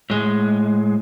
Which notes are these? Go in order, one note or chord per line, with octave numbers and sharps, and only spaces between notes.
A2 G#3